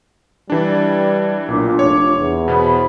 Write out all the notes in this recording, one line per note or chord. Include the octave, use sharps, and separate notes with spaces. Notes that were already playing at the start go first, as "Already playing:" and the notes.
E3 G3 D4 D5
B1 A#2 D4 F4 D6
F1 C#5
E2
B2 B3 C5 B5